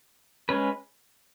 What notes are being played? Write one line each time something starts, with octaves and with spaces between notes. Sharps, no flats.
G#3 C#4 B4